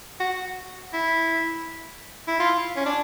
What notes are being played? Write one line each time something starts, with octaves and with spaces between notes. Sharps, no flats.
F#4
E4
E4
F4
C#4
D4